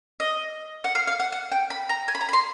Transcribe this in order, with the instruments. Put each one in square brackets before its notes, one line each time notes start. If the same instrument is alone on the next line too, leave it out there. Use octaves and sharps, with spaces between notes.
[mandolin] D#5
F#5
F5
F5
F#5
F#5
G5
B5
A#5
G#5
B5
A#5
B5
C6